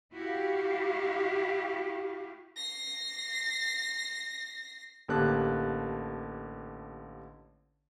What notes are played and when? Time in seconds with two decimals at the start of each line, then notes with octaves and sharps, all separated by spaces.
0.13 E4 F#4 G4 F5
2.56 A#6 C7
5.08 A1 D3 A#3 G4 A5 F#6